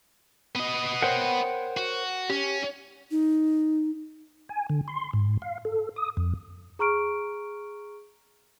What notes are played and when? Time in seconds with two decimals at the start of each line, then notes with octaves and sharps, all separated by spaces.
0.55 B3 D#5
1.02 A#4 C5 C#5 F#5 G5
1.77 F#4
2.30 C#4 G4
3.11 D#4
4.49 G#5
4.70 D3
4.88 C6
5.13 G#2
5.42 F5
5.65 A4
5.96 D#6
6.17 F2
6.79 G#4 A#5 C#6 F6 D7